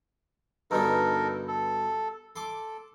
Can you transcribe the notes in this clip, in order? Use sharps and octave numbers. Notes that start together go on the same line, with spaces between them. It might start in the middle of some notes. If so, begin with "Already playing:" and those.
G2 B2 D3 D#4 A4 A#4
A4
A4 C6 D6